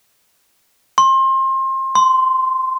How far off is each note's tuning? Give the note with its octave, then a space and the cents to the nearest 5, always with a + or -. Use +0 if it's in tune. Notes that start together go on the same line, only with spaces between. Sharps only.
C6 +30
C6 -10